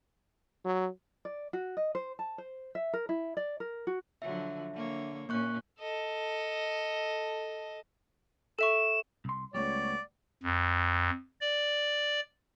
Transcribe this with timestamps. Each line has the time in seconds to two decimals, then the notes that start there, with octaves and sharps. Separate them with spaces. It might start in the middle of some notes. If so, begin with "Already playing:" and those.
0.65 F#3
1.25 D5
1.53 F#4
1.77 D#5
1.95 C5
2.19 A5
2.38 C5
2.75 E5
2.93 A#4
3.09 E4
3.37 D5
3.60 A#4
3.87 F#4
4.22 D3 F3 F#3 E5
4.73 D3 A#3 C#5
5.29 A#2 A#3 C#4 C#6 F#6
5.79 A4 D#5
8.59 A4 E5 C#6 E7
9.25 C2 C6
9.54 C#2 G3 A3 B3 C#5 D5
10.43 F2
11.41 D5